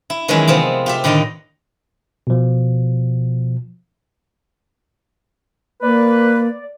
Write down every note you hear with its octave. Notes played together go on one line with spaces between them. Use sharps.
E4
D#3 E3 F#3 G#3 C#4 E4
C3 F3 B3 C4
F4 G4 E5
A2 D3 D#3 D5 D#5 A#5
B2 F3
A#3 B4 D5